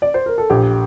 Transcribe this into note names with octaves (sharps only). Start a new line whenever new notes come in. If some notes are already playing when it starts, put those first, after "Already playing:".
D5
C5
A#4
A4
A#1 G4